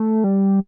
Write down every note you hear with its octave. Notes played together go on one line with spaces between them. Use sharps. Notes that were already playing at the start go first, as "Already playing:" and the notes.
Already playing: A3
G3